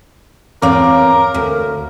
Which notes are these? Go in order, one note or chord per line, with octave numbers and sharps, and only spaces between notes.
E2 C4 A#4 C#5 F5 D6
D2